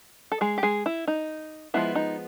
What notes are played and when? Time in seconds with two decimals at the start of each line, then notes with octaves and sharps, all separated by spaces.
0.32 A4
0.41 G#3 G#4
0.58 G4
0.63 G#3 G#4
0.86 E4
1.07 D#4
1.74 F3 G#3 B3 E4
1.95 D#4